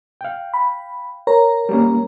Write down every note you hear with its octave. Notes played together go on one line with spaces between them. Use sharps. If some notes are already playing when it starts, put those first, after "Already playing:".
F5 G5
B5
A#4 C#5 A#5
G3 A#3 C#4